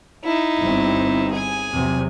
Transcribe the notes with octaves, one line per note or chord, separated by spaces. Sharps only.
D#4 E4
G1 G2 C4
G#4 G#5
E2 C3 F#3